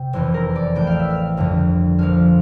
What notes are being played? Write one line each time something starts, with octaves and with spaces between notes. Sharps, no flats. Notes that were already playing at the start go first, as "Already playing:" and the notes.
Already playing: C3 G5
F1 E2 E3 C5
A#4
D5
A1 A2 E3 G5
F5
E5
F5
G1 F2 D3 F3
A#1 A#2 F3 F5